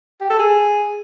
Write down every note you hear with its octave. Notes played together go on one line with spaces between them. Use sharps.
G4
A4
G#4